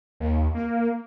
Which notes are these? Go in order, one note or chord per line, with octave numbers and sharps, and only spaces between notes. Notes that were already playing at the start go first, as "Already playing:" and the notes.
D#2
A#3